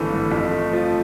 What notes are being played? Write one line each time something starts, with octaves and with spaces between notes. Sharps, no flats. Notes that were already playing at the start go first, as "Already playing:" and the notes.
Already playing: G#1 D3 E3 A3 A4
G2
F2
A3
F3